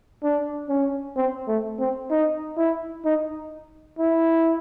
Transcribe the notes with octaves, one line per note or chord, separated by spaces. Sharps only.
D4
C#4
C4
A3
C4
D#4
E4
D#4
E4